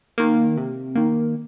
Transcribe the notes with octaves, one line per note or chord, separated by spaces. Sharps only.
D#3 A#3
C3
D#3 A#3